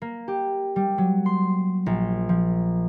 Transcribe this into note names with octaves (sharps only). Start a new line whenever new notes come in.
A#3
G4
G3
F#3
C6
A#1
F3